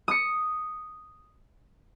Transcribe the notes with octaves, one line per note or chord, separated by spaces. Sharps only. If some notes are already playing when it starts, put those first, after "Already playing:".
D#6 C#7